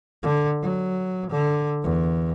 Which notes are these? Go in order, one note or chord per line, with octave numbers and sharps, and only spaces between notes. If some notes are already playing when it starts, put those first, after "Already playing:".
D3
F#3
D3
E2